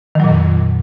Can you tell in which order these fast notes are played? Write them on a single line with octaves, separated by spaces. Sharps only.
D#3 F#3 A#2 F2